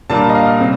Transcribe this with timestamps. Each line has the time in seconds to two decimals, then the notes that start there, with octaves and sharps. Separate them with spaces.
0.10 A#2 G3 A#3 D4 A5
0.29 D#5
0.35 F5
0.60 C3 G3 C4